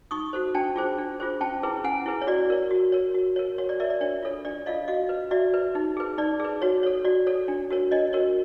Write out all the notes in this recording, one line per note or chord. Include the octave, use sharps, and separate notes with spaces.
D#4 C#6 D#6
F#4 A4 C5
D4 G5 A5
F4 G#4 C5
D4
F4 G#4 C5
C#4 G5 A5
E4 G#4 B4
C#4 F#5 G#5
E4 G#4 B4
C#5
F#4 D5
A#4 C#5
F#4
A#4 C#5
F#4
A#4 C#5
F#4 C#5
D5
A#4 C#5 D5 E5
D5
D4 C#5
F4 A4 C#5
D4 D5
F4 A4 C#5 D#5 F5
F#4 D#5 F5
B4
F#4 D5 E5
B4
D#4
G#4 B4
D#4 D5
G#4 B4
F#4 C#5
A4 C#5
F#4 D5
A4 C#5
D4
F#4 A#4 C#5
D4 C#5 D#5
F#4 A#4 C#5